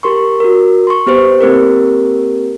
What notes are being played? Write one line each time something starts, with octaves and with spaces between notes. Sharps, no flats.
G4 A#4 C6 C#6
F#4 A#4
C6 C#6
B3 G4 B4 C5
A#3 C4 G4 A#4